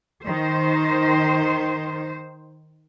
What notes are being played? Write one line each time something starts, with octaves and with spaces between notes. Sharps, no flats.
D#3 C5